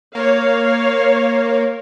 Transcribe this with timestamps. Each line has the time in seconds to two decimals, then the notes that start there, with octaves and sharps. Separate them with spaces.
0.15 A#3 C#5 F5